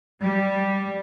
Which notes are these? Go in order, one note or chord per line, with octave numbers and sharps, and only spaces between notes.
G3